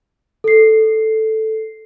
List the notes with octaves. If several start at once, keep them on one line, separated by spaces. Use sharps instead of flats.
A4 C7